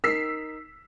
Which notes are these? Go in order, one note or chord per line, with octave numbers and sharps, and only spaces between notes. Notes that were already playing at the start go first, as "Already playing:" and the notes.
D#4 A#4 E6 B6 C7